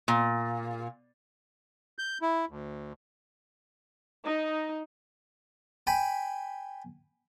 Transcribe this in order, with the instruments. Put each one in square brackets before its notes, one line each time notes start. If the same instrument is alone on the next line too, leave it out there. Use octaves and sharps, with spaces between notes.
[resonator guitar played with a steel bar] A#2
[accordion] G6
E4
D2
[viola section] D#4
[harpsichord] G5 G#5 B5